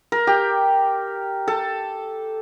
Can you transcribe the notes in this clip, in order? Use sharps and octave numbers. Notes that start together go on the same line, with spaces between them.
A#4
G4
A4